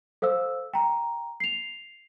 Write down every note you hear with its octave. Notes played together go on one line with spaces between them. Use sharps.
A4 C5 F5 E6
G5 A#5
C7 F7